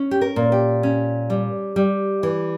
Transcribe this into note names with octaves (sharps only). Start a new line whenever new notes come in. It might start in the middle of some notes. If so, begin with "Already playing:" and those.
Already playing: C#4
G4
A#4
A#2
G4
C#4
G3
G3
E3